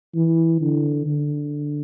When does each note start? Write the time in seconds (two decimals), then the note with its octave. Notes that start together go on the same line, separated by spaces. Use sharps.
0.15 E3
0.61 D3
1.06 D3